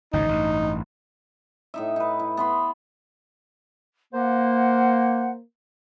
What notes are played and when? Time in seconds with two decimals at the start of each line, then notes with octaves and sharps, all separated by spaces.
0.13 G#1 C#2 A2 D#4
0.29 A1 G2
1.74 A2 D#4 E5
1.96 D#4 B4
2.19 E4
2.37 B3 B5 C6
4.14 A#3 C5 F#5